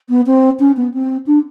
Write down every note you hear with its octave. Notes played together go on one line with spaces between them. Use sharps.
B3
C4
C#4
B3
C4
D4